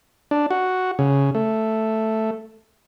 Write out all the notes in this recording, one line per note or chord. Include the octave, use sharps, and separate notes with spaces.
D4
F#4
C#3
A3